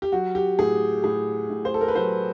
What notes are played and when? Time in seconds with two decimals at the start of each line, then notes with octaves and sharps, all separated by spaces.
0.02 G4
0.12 F#3 F#4
0.35 G4
0.59 A2 G#4
1.04 A2 G#4
1.50 A2
1.65 C5
1.74 A4
1.81 A#4
1.88 B4
1.96 F#3 C5